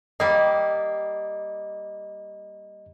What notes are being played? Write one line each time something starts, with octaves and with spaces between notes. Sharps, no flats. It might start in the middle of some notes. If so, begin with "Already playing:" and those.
G3 A#3 D#5